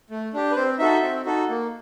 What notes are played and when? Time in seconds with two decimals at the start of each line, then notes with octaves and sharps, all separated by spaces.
0.10 A3
0.33 D4 G4
0.51 B4
0.56 C4 C5
0.79 D#4 F#4 A4 E5
1.03 C4
1.26 D#4 F#4 A4
1.49 A#3